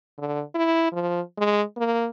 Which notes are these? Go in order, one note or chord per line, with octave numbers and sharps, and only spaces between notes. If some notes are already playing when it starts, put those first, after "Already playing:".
D3
E4
F3
G#3
A#3